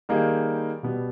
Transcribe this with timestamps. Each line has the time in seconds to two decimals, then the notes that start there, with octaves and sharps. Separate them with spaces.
0.09 D#3 G3 A#3 D#4 G#4
0.83 B2 G3 B3